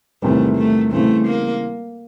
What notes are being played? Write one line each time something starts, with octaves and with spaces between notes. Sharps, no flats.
E2 C3 D#3 G3 A3
A3
C#3 E3 G3 A3 C4
A#3